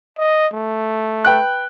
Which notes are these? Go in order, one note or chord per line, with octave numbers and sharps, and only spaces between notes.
D#5
A3
B4 G5 F#6